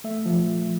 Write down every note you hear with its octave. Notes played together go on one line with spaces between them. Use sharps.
A3 E5
F3